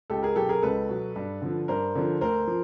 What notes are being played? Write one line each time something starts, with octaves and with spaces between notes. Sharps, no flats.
C#2 G4 A4
G#4 A#4
B2 F#3 G4 A4
G#4 A#4
C#2 A4 B4
B2 F#3
G2
D3 F3
G2 A#4 C5
D3 F3
D2 A#4 C5
F3